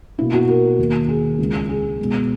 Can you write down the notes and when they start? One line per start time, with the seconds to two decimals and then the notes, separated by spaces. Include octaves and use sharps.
0.18 B2 A#3 E4
0.34 F#4
0.49 A#4
0.79 D#2 D#3 A#3
1.09 G#4
1.39 C#2 C#3 G#3
1.69 G#4
1.99 B2 G#3 B3